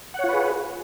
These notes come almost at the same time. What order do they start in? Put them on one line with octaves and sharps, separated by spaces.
F#5 C#5 F4 B4 G#4